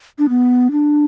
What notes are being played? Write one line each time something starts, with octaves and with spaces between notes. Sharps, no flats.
D4
B3
D4